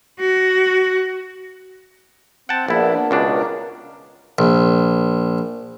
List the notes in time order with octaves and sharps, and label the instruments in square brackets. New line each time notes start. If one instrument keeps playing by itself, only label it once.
[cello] F#4
[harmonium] C4 [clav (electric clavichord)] F#5 G5 A5
[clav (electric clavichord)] A#1 E4 [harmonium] A#3 B3 D4
[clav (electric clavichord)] C#2 B2 D4
[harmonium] A#4
[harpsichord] A#1